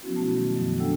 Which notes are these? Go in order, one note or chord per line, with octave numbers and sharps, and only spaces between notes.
F3 F#3 B3 C#4 E4 F#4
B2 A3 F#4 A5
D#3
F#2 D#3 F3 F#3
D#3 D4 A4 F#5 G5 E6